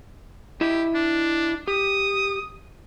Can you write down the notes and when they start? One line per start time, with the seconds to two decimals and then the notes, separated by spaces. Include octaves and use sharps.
0.61 E4 G4 D#5 E5
0.95 D4
1.68 G4 D#6